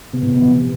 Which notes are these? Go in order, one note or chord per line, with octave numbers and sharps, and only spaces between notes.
C3 B3
A2
C3
E3
C3